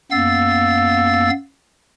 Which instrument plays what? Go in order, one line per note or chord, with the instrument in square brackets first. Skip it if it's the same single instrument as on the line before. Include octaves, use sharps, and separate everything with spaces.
[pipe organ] F#2 A#3 B3 F5 E6 A6